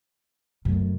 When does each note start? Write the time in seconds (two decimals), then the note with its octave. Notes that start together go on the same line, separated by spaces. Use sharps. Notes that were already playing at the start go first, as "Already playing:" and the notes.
0.65 F#2 C3 A3